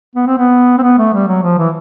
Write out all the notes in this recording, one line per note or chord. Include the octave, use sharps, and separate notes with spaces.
B3
C4
B3
C4
B3
A3
G3
F#3
F3
E3